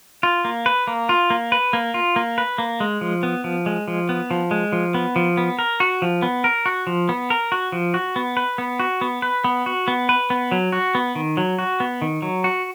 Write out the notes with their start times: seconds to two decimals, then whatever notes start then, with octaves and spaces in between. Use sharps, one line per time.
0.23 F4
0.45 A#3
0.66 B4
0.87 A#3
1.09 F4
1.30 A#3
1.52 B4
1.73 A#3
1.94 F4
2.16 A#3
2.38 B4
2.58 A#3
2.80 G#3
3.01 F3
3.23 B3
3.44 F3
3.66 G#3
3.88 F3
4.09 B3
4.31 F3
4.51 G#3
4.72 F3
4.94 B3
5.16 F3
5.37 B3
5.59 A#4
5.80 F#4
6.02 F3
6.22 B3
6.44 A#4
6.66 F#4
6.87 F3
7.09 B3
7.30 A#4
7.52 F#4
7.72 F3
7.94 F#4
8.16 B3
8.37 B4
8.58 B3
8.80 F#4
9.01 B3
9.22 B4
9.44 B3
9.66 F#4
9.88 B3
10.09 B4
10.30 B3
10.52 F#3
10.72 F#4
10.95 B3
11.15 D#3
11.37 F#3
11.59 F#4
11.80 B3
12.02 D#3
12.22 F#3
12.44 F#4